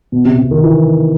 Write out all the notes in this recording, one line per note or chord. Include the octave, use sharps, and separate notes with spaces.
B2
C3
C3
D#3
E3